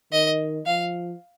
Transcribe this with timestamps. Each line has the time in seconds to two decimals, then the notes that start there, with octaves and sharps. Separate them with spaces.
0.12 D#3 D#5
0.66 F3 F5